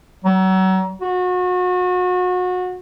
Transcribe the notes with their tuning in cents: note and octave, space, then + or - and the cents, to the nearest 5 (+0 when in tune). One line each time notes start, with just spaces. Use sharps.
F#3 +35
F#4 -30